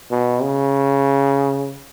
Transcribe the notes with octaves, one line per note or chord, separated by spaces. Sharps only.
B2
C#3